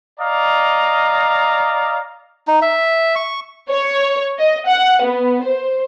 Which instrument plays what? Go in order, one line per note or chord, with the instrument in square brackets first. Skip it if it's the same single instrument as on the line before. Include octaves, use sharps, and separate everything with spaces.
[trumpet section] D5 D#5 F5 A#5
[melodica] D#4
E5
C#6
[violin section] C#5
D#5
F#5
B3
C5